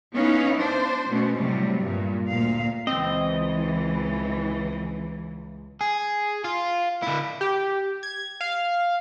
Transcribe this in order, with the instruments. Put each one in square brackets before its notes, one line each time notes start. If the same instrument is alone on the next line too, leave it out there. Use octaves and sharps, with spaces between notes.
[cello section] B3 C#4 D#4 E4 F5
D4 C5
B2 A3 C#4
A2 C3 F#3 G3
G2 A#2
D2 A#2 F5
[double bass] C#2 [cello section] E3 [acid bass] C4 [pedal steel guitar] D#5
[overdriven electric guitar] G#4
F4
D3 E4
[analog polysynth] G4
G#6
F5